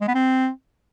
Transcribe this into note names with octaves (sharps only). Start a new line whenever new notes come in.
G#3
B3
C4